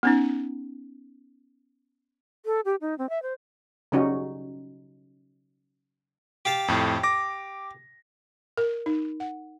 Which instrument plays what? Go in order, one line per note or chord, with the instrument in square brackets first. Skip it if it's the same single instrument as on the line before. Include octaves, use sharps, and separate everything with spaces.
[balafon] B3 C#4 D#4
[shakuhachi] A4
G4
D#4
C4
E5
C5
[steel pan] C#3 F#3 G3 C#4 D#4 F#4
[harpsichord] G4 F5 A5
[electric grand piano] F2 A2
D6 A#6
[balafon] A#4
D#4
F#5